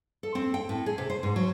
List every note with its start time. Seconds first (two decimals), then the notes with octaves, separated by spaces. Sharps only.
0.23 A4
0.35 C4
0.54 G5
0.69 A2
0.86 G#4
0.98 C3
1.10 C5
1.23 G#2
1.36 F#3